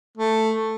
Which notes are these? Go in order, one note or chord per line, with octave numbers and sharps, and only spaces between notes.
A3